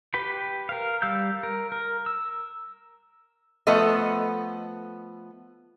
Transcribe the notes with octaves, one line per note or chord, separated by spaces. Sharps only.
G4 B4 G5 B5
A#4 F5
G3 F5 E6 G6
A#4
A#4
E6
F3 A3 B3 A4 D#5